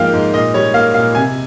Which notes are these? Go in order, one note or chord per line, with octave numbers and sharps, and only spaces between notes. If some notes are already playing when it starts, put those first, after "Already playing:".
Already playing: G#2 F3 A#3 F5 G5
G#2
A#2 D#5
G3 C#5
A#3 F5
A#2 F5
C3 G#5